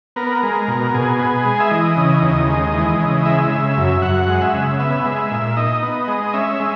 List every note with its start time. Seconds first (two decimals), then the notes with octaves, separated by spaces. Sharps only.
0.16 B3 A#4
0.43 G#3
0.68 B2
0.94 B2 G#4
1.19 B3
1.45 G#3
1.60 E5
1.71 E3 D#5
1.97 C#3
2.22 D#2
2.48 G#3
2.74 E3
3.00 C#3
3.25 G#3 E5
3.51 C#3
3.77 F#2
4.02 F#2 F#5
4.28 G#3
4.42 E5
4.54 C#3
4.79 B3 E5
5.05 G#3
5.31 A#2
5.57 D#4 D#5
5.82 B3
6.08 G#3
6.34 C#4 E5
6.60 G#3